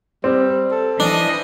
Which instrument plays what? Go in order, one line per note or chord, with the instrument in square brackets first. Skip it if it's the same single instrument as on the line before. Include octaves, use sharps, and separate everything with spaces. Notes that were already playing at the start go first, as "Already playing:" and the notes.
[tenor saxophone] G3 [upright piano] C4
[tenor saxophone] A4
[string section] E3 D#5 [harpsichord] D4